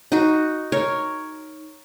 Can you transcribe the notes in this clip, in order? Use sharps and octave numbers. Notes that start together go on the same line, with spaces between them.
D#4 F#4
A#4 C#5